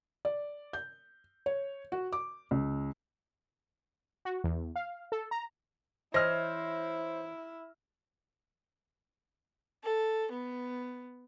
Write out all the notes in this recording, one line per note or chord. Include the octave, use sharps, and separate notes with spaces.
D5
G6
C#5
F#4
D6
C#2
F#4
E2
F5
A4
A#5
E3 E4 C5 C#5 D#5 F6 A#6
A4
B3